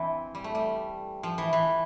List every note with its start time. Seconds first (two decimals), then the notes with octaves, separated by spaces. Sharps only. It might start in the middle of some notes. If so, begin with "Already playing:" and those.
Already playing: E3 C4 D4
0.35 G3
0.44 A3
0.55 G3
1.23 F3
1.38 E3
1.53 E3